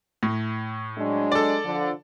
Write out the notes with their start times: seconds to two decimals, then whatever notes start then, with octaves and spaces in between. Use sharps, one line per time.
0.23 A2
0.98 F#3 G#3 D4
1.32 A4 D5
1.65 D3 F3